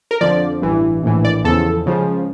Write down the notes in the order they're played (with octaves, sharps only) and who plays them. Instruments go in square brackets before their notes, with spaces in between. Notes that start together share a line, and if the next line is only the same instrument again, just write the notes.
[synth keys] A#4
F2 D3 F3 D5
A1 G2 E3
A#1 A2 E3
D5
E2 C#3 F3 A4
C#2 C#3 F3